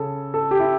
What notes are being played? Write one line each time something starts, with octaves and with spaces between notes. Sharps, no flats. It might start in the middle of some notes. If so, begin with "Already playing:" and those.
Already playing: C#3 C#4 A4
A4
G4
E4